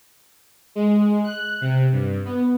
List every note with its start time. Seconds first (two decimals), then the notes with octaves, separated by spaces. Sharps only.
0.75 G#3
1.24 F#6
1.61 C3
1.92 G2
2.25 B3